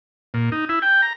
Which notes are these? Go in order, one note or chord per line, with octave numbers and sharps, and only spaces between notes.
A#2
D#4
E4
G5
A#5